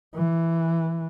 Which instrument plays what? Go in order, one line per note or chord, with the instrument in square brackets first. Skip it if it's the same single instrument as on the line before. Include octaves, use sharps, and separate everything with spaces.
[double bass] E3